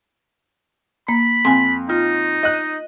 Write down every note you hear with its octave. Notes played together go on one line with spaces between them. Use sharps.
A#3 B5
F2 G#5 C6
D#4 F4
D#5 F#6